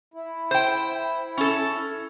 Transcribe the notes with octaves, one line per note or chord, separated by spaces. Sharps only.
E4
C5 G5
C#4 A4